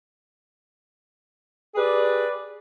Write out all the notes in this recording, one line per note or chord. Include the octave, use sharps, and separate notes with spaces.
G4 G#4 B4 D5